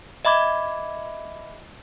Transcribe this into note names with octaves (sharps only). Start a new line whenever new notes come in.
D#5 E5 B5 D6 G#6